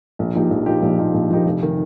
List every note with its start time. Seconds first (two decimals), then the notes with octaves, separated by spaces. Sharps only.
0.19 A#1
0.35 A#2 F3 D#4 G4
0.51 A#1
0.66 A#2 F3 D#4 G4
0.82 A#1
0.99 A#2 F3 D#4 G4
1.14 A#1
1.30 A#2 F3 D#4 G4
1.46 F1
1.63 D#3